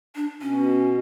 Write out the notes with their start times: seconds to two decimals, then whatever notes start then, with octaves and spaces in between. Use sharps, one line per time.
0.16 D4
0.41 B2 C#4